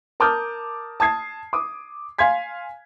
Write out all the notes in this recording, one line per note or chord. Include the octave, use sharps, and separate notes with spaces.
A#4 A5 D6 D#6 F6 G6
A5 D#6 G#6 C7
D6 D#6
F5 G#5 C6 G#6 B6